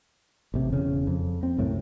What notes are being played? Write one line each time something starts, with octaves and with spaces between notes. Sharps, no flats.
A1 C3
E1 C#3
F2
C4
C2 F#2 A2